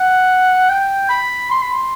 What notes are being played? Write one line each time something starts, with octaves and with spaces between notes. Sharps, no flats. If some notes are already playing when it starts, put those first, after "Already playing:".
Already playing: F#5
G5
B5
C6
B5
C6